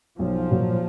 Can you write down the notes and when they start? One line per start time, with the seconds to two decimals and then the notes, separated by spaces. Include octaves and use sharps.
0.18 B1 F3
0.51 A#2 F#3